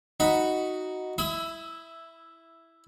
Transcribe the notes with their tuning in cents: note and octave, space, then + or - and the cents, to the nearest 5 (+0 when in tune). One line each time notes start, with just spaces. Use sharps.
D#4 +5 F#4 +0 B5 +0
E4 +0 B5 +30 D#6 +40